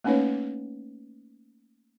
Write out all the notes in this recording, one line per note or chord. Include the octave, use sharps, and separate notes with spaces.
A3 A#3 C#4 D#4 B4 C#5